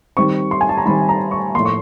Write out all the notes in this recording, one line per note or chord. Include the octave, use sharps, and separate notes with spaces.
D#3 G3 C4 C#6
C6
G#5
A5
A#5
D#3 G3 C4 B5
A#5
C#6
A2 F3 A#3 C6
C#6